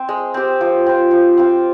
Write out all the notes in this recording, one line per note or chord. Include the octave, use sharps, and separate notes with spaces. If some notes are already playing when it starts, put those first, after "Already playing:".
Already playing: C4
G#3
C4 G4
F3
C4 F4
F3
C4 F4